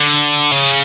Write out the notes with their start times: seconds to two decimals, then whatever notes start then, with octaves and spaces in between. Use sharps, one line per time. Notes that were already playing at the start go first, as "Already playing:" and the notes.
Already playing: D3
0.51 C#3